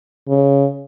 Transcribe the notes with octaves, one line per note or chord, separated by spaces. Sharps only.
C#3